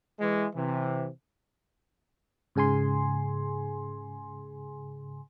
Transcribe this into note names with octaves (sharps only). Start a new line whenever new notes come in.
E3 G#3
C3 E3
G#2 C#3 G#4 G#5 C6